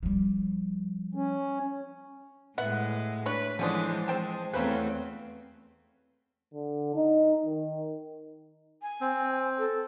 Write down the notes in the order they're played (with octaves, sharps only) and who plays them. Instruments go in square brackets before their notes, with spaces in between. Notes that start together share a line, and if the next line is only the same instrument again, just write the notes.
[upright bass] F3 G3
[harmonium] C#4
[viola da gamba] A2 G#3 [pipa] B3 F#5 [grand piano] E5
[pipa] D4 C#5 B5 [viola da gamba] B4
[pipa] D3 C#4 D4 [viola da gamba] E3 G#3 [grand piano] F3 C5 D#6
[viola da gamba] G#3 [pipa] C4 G5 A5
[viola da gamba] E2 A3 C4 [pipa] C#3 F#3 C#4 [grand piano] B4 C5
[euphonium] D3
D#4
D#3
[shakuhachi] G#5
[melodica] C4
[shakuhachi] A4